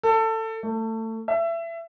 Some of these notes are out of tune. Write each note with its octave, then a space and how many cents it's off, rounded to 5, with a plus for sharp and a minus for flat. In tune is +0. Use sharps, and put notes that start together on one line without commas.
A4 +20
A3 +25
E5 +25